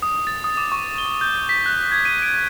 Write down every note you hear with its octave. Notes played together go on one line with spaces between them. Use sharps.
D#6
A6
D#6
D6
C#6
G7
G6
B6
F#6
G#6
D#7
D7